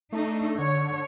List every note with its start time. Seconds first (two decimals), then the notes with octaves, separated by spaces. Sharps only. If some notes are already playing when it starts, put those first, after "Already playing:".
0.13 A3 D4 D#4
0.59 D3 C#5